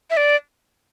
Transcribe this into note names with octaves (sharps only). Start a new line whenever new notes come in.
E5
D5